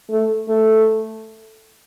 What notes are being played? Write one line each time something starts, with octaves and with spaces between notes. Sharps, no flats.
A3
A3